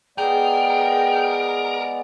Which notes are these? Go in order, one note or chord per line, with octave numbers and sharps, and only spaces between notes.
G#3 B3 G#4 A#4 D5 G5